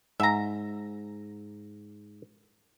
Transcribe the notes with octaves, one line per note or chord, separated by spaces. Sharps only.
G#2 E5 A#5